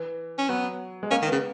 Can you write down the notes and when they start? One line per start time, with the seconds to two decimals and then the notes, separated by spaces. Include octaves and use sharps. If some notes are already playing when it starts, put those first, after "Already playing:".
Already playing: E3
0.38 C#4
0.49 F#3 B3
1.03 G#3
1.11 A#3 C#4
1.22 D#3
1.27 B3
1.32 C#3